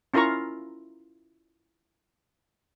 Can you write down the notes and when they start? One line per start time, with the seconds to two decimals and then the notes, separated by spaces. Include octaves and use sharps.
0.14 C#4 E4 F4 A#4 A#5 C#6